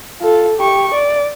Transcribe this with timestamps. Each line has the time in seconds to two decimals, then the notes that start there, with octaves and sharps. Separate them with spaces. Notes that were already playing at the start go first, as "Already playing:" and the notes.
0.21 F4 A4
0.57 G4 C#6
0.94 D5